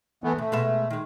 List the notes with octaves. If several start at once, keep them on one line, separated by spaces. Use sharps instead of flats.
E3 A3 B3
C3 A3
B2 G#3 E5
D#3 G#3